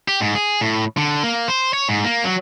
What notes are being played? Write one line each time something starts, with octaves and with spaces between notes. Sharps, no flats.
G4
G#2
G#4
A2
D3
A#3
C5
C#5
G#2
A#3
F#3